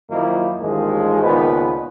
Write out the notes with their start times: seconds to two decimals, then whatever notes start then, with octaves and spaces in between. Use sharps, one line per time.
0.10 F#2 D#3 F3 F#3 A#3 E4
0.61 A1 D#2 D#3 F3 G#3
1.23 C#2 A#2 D#3 F3 B3 B4